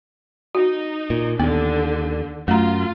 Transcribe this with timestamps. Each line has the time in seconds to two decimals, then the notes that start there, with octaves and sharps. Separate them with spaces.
0.55 D#4 F#4
1.10 A#2
1.40 D#2 D3 B3 D4
2.48 F#2 A3 F4 A#5